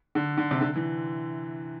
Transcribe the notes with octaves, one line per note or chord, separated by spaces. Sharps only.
D3
D3
C3
D3
E3